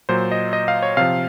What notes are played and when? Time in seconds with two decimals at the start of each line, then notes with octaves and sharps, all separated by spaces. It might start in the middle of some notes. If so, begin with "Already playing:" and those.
0.09 A#2 F#3 C5
0.32 D#5
0.53 D#5
0.68 F5
0.82 C#5
0.97 C3 F3 F5